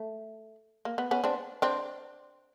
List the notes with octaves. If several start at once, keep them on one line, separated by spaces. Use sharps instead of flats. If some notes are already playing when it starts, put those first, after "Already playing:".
Already playing: A3
A#3
B3
B3 C#4
C4 D4
C4 D4